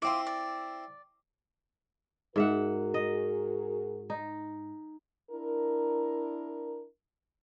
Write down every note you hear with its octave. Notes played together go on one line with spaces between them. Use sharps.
C4 E4 F4 D6
D5
G#2 F#4 G#4 A#4 E5 F#5
D#5
D#4
D4 E4 A#4